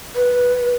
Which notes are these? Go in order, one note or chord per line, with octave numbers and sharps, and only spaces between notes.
B4